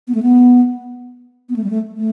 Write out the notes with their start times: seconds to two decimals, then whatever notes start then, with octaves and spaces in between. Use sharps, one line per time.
0.08 B3
0.15 A3
0.22 B3
1.49 B3
1.56 A3
1.64 G3
1.70 A3
1.97 A3